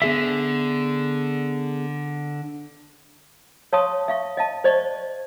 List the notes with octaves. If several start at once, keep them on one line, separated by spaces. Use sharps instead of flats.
D3 B3 G#4 E5
C#5 F5 A5 C6 C#6 D#6
E5 F5 C#6
D#5 F5 A5
C5 D5 D#5 C#6